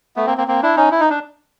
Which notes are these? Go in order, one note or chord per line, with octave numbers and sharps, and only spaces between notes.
A3 B3
A#3 C4
A#3 C4
A#3 C4
D4 E4
C#4 D#4
E4
D#4
D4